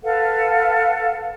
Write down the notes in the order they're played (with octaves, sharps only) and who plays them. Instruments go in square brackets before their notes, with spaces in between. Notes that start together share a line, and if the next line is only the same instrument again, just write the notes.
[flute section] A4 B4 F5 F#5